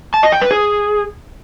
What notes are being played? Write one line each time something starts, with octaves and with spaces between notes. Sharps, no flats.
A5
D#5
G5
B4
G#4